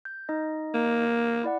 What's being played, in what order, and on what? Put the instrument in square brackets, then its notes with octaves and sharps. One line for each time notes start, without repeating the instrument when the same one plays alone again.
[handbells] G6
D#4 D#5
[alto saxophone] A#3
[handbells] E4 D5 F#5